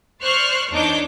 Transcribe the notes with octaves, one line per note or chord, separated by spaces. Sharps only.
C5 D5 C#6 F6 F#6
E2 D4 D#4 C#5 D6 G6